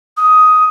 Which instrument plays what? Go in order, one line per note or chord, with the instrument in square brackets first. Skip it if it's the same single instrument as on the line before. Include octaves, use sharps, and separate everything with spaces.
[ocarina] D#6